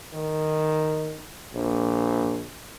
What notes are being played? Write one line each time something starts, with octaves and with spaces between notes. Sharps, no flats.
D#3
A#1